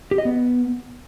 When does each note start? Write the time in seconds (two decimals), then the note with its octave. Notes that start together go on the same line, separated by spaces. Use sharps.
0.11 G4
0.18 D#5
0.25 B3